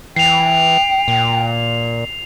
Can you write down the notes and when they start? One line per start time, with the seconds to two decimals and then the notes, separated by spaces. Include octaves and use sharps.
0.16 E3 G5 C7 F7
1.08 A#2